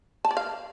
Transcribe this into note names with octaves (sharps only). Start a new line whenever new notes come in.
A5
D5
F5